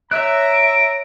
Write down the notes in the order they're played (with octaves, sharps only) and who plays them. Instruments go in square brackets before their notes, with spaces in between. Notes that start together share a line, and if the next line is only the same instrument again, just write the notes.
[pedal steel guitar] C#5 E6 F#6 [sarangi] E5 [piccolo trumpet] A#5 [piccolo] D7